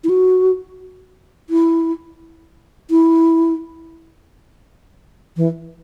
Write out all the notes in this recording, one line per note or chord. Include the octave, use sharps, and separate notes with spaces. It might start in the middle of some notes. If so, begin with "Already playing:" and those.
E4
F#4
E4
E4
E3